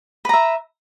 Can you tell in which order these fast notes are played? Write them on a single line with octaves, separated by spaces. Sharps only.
B4 A#5 E5